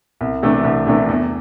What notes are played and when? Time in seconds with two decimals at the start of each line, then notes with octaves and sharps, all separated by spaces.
0.21 C2
0.43 C3 E3 A3 D4
0.64 C2
0.87 C3 E3 A3 D4
1.09 E2